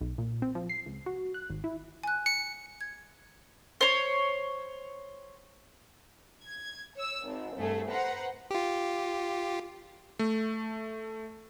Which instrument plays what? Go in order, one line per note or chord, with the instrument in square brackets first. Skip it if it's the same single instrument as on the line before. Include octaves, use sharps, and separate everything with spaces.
[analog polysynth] B1
A#2
C4
F3
C7
C#2
F#4
F#6
G#1
E4
[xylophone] G#5 F#6
[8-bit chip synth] C#7
[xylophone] G#6
[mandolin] C5 C#5
[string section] G#6
C#5 E6
G#1
C2 G2 A3 G#4
B4 C5 F#5 A#5
[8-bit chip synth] F4 G4
[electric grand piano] A3